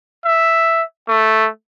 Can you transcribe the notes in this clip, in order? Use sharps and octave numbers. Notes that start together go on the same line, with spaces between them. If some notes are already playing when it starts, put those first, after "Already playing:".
E5
A3